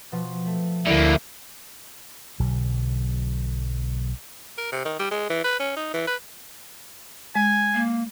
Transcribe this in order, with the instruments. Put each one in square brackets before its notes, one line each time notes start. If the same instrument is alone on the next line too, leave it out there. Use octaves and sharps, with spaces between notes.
[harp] B2 F3
A3
[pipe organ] D2 E4 [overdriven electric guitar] D3 A#3
[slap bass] B1 B2 D3 F#3
[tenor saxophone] A#4
C3
D#3
G3
G#3
E3
B4
C#4
D#4
E3
B4
[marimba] G#3 [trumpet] G#5
[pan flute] A#3